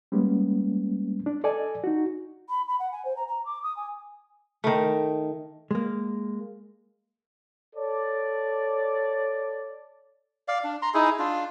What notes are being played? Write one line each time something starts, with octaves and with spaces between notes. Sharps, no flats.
G3 G#3 A#3 B3 C#4
D4
A4 D5 D#5 G#5
D#4 F#4
B5
B5
F#5
G#5
C5
A#5
A#5
D6
D#6
G#5
D#3 A3
G#3 A#3
A4 C#5 D5
D5 F5
D4
A#5 C6
D#4 E4 G#4
D4 F4